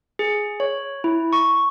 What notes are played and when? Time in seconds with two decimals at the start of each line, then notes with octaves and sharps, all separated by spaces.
0.19 G#4
0.60 C#5
1.04 E4
1.33 C#6